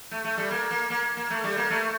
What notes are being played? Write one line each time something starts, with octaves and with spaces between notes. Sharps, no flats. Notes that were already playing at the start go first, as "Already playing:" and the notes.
A3
A3
G3
A#3
A#3
A#3
A#3
A3
G3
A#3
A3